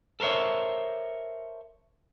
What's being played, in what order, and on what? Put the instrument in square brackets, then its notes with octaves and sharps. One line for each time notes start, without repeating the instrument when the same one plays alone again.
[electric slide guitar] A4 A#4 C5 C#5 E5